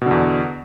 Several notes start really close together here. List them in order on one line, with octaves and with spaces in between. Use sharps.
B2 D3 E2